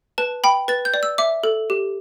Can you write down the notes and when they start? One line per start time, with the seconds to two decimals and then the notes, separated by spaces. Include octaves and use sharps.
0.18 B4 A5
0.44 G5 B5
0.68 B4 A6
0.85 G6
0.94 D5
1.03 E6
1.18 E5 D6
1.44 A4
1.70 G4